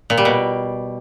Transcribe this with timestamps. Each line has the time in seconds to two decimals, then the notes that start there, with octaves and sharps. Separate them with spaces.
0.10 A#2
0.18 G3
0.25 B2